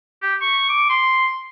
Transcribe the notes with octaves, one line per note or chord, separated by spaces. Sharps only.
G4
C#6
D6
C6